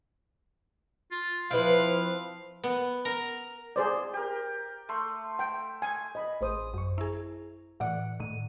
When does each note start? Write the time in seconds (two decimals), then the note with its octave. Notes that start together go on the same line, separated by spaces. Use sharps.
1.11 F4
1.51 F3 C4 E4 B4 F5
2.64 B3
3.05 A#4
3.76 G#4 C5 D5
4.13 G4 A#4
4.89 A3 C6
5.39 G5
5.82 G#5
6.15 D#5 B5
6.41 A1 G#4 C5 D#6
6.74 F#2 C#6
6.98 E4 G#4 A#5
7.80 A2 E3 D5 F#5
8.20 A2 D#3 D#7